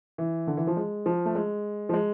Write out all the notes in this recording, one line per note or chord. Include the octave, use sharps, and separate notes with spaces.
E3
D3
E3
F3
G#3
F3
A3
G#3
F3
G#3